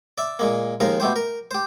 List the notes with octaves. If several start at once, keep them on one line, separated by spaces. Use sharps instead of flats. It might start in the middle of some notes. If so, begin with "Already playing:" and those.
D5 E5
A#2 G#3 A#3
D#2 F3 G#3 A#4 F5
B2 A3 G4 C5
A#4
G4 C5